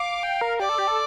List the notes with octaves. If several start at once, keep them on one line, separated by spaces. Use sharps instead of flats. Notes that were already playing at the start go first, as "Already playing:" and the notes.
Already playing: F5 D6
G5
A#4
G4 D5
A4
G4
A4